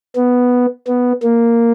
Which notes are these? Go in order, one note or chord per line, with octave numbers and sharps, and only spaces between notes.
B3
B3
A#3